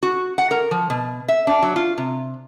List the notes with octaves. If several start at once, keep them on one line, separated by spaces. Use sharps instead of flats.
F#4
F#5
A#4
F3
B2
E5
D4
F#3
F4
C3